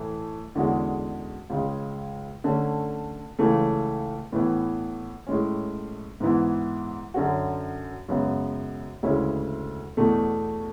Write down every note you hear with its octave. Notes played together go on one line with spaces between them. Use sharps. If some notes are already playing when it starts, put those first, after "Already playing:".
Already playing: A2 E3 A3
E2 D3 G#3 C#4 F#4
C#2 C#3 G#3
D3 A3 C#4
C#2 C#3 E3 A3 C#4
A2 E3 B3
A2 G#3 C#4
G#2 E3 B3 E4
F#2 D3 F#3 C#4 F#4
F#2 C#3 G#3 B3 F#4
D2 C#3 G#3 C#4 E4
E2 B2 A3